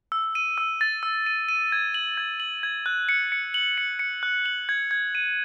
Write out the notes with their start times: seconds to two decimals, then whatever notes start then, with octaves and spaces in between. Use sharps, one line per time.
0.12 E6
0.35 D#7
0.58 E6
0.81 A6
1.03 E6
1.26 D#7
1.49 D#7
1.72 G#6
1.94 F#7
2.18 G#6
2.40 F#7
2.63 G#6
2.86 F#6
3.09 C#7
3.32 C#7
3.54 F#7
3.78 C#7
3.99 C#7
4.23 F#6
4.46 F#7
4.69 G#6
4.91 G#6
5.15 D#7